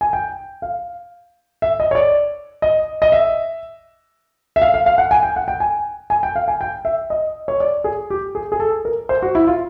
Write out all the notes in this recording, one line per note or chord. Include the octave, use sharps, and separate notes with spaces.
G#5
G5
F5
E5
D#5
C#5
D5
D#5
D#5
E5
E5
F5
F5
F5
F#5
G#5
G5
F#5
G5
G#5
G#5
G5
F5
G#5
G5
E5
D#5
C#5
D5
G#4
G4
G#4
G#4
A4
A#4
C5
F#4
E4
F4